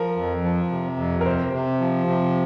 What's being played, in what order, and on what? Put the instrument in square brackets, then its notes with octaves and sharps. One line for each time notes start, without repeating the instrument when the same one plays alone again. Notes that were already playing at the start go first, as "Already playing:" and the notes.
Already playing: [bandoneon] F3 [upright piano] A#4
[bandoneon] F2
F3
C3
F2
[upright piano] A#4
[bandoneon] C3 [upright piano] C5
[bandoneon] C3
F3
C3